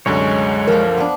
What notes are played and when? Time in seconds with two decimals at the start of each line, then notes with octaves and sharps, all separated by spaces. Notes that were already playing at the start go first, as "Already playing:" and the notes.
0.06 C2 F#2 D3 G#3 C#5
0.67 F3 A#3 A#4
0.97 B3 D4